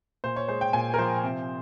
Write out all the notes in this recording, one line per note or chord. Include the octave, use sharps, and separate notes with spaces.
A#2 C5
C#5
G#3 C5
G5
A#2 G#5
A#4
F3 C5
C3